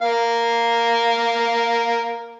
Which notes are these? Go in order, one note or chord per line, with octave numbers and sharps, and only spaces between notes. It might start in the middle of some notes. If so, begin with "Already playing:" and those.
A#3 F5